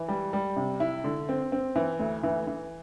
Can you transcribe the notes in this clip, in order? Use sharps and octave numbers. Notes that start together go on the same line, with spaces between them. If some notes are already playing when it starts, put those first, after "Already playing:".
Already playing: E3
G3
G3
C3
E4
D3
C4
C4
E3
D2
E3
E3